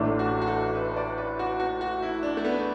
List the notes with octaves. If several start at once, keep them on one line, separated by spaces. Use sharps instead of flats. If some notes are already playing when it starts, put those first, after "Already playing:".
Already playing: A1 A2 A3 D4
F#4
F#4
A4
B4
D5
B4
F#4
F#4
F#4
E4
D4
A3
B3